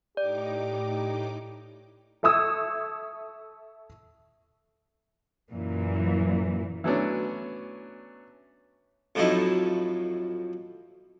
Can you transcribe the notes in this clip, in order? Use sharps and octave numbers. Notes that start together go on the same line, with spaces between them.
A2 D#4 G4 D5 D6
A4 E5 C#6 D#6 E6 G#6
F#2 A#2 E3
E3 F#3 A3 B3 C#4 D4
F2 A2 F3 F#3 D#4 E4